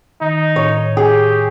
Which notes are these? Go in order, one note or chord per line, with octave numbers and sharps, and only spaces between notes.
D#3 D#4
A2 C#5
G4 G#4 G#5